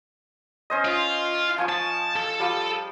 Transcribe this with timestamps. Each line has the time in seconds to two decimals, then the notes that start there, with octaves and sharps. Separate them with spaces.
0.70 C#4 C5 D#5
0.85 F4
1.58 F3 G#5 C#6
1.69 A5
2.16 A4
2.40 F3 G3